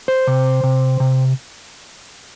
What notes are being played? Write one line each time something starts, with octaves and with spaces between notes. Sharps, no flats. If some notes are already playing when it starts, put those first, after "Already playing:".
C5
C3
C3
C3